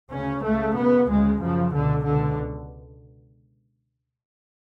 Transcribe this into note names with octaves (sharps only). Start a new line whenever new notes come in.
D2 C#3 C#4
C#2 C#3 A3
F#2 C#3 B3
D2 C#3 G#3
F#2 C#3 F3
C#2 B2 D3
C#2 B2 D3